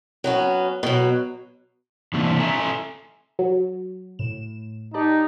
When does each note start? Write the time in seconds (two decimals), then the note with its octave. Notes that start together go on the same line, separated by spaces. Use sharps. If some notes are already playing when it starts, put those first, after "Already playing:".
0.24 F#3 B3 C#4
0.83 B2 F#3
2.14 D3 E3 A#3 C4 D4
2.39 A4 E5 G#5 A#5
3.39 F#3
4.19 A2 E7
4.94 D#4 G4 D5 A5